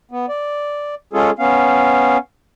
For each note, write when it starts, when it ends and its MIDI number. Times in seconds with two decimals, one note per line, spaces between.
0.11 0.26 59
0.29 0.95 74
1.13 1.30 56
1.13 1.30 61
1.13 1.30 65
1.13 1.30 68
1.13 1.30 69
1.39 2.17 59
1.39 2.17 61
1.39 2.17 77